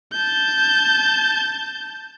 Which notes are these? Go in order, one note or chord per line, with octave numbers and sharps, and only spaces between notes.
A5 G6